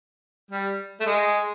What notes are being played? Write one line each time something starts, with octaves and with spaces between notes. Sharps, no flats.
G3
A3
G#3